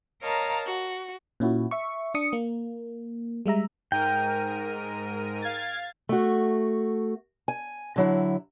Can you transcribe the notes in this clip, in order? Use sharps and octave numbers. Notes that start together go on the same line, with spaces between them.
A#4 C#5 D#5 F5 A5 A#5
F#4
A#2 C#4 E4 F#4
E5 C#6
D4 D#6 C#7
A#3
G3 G#3 E5 A#5
G#2 A#4 G5 D#7
F5 G#6 A6
A3 F#4
G#5
D3 F#3 E4